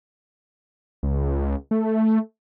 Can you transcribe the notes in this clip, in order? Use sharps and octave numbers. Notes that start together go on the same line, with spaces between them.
C#2
A3